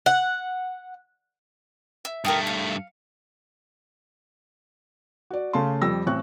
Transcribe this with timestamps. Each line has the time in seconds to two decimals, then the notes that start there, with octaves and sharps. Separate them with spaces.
0.06 F#5
2.05 E5
2.25 G2 A3 A#4 G5 D#6
2.47 F5
5.30 F#4 D5
5.53 C#3 A3 F5 A5 C6
5.81 F2 G3 E6 A#6
6.06 A1 C4 C#6 F#6